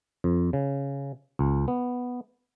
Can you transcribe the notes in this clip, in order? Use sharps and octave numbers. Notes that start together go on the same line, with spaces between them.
F2
C#3
C#2
B3